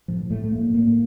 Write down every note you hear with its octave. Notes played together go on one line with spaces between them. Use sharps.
A2 F3
A2 A3
A2 A#3
A2 A#3